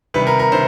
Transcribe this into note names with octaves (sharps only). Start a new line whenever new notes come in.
C3 D#3 G3 B4
A#4
A#4
C3 D#3 C5